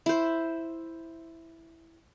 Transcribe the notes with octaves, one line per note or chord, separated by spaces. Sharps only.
E4 C5